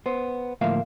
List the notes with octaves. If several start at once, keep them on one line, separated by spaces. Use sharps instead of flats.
B3 C5
D2 A2 F3 A#3 E5 F5